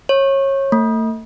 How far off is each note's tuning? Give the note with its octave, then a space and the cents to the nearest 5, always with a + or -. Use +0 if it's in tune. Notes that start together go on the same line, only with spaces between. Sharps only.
C#5 -25
A3 +35